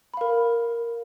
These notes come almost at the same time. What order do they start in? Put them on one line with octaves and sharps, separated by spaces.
B5 F5 A#4